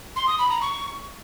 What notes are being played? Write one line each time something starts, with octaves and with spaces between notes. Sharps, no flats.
C6
D#6
B5
A#5
C#6